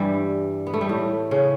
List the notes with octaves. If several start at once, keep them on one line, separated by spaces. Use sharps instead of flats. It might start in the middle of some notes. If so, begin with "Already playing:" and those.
Already playing: G2 E3 G3
B3
A3
G3
A2 A3
C#3 C#4